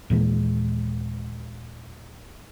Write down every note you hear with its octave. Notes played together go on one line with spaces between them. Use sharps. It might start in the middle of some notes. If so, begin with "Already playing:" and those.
D#2 A#2 E3 G#3